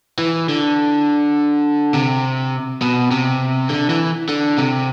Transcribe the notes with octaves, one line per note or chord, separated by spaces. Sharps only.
E3
D3
C3
B2
C3
D3
E3
D3
C3